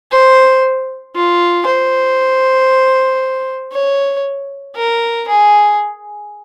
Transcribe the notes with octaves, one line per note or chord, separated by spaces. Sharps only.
C5
F4
C5
C#5
A#4
G#4